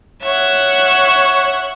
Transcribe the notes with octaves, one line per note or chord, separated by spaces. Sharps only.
C#5 E5 F#5